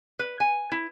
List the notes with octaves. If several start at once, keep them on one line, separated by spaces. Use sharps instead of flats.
B4
G#5
E4